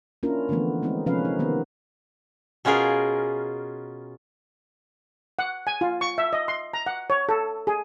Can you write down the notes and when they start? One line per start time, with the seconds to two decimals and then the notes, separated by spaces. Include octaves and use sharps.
0.23 A#3 C#4 D4 E4 F4 A#4
0.49 D3 E3 F3 A3 B3
0.82 G#3 A#3 C4 D#4
1.06 C3 F3 C#4 B4 F5
1.25 D#4
1.39 D#3 A#3 B3
2.65 B2 C#4 F4 G#4 A#4
5.39 F#5
5.67 G#5
5.81 F4
6.01 C#6
6.18 E5
6.33 D#5
6.48 C6
6.74 A#5
6.86 F#5
7.10 C#5
7.29 A4
7.67 G#4